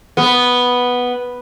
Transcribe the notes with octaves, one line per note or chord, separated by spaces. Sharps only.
B3